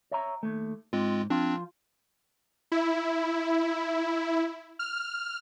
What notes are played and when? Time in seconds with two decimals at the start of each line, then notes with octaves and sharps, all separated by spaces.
0.11 C#5 E5 A#5
0.43 D#2 A3
0.93 G#2 G#3 C4 F4
1.30 F3 C4 D4 F4
2.72 E4
4.79 F6